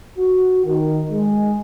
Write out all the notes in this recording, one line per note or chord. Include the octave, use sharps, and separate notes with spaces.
F#4
D#3
G#3